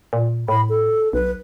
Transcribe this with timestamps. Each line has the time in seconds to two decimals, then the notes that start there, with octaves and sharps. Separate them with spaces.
0.13 A#2
0.48 A2 B5
0.69 A4
1.13 B1 B4